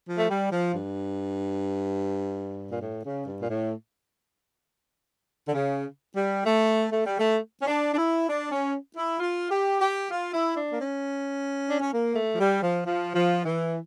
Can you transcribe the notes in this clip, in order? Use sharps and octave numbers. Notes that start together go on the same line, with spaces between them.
F3
A3
G3
F3
G2
A#2
A2
C#3
G2
A#2
A2
D3
C#3
G3
A3
A3
G3
A3
C#4
D4
D4
E4
D4
C#4
E4
F4
G4
G4
F4
E4
D4
A#3
C#4
D4
C#4
A#3
A3
F3
G3
F3
F3
F3
E3